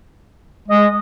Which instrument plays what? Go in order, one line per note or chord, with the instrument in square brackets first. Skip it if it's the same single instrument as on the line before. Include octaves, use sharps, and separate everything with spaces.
[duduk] G#3 [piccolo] D#5